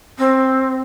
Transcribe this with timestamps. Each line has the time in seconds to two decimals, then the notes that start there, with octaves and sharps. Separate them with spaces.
0.18 C4